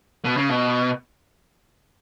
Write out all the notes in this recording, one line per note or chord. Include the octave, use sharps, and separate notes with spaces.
B2
C#3
B2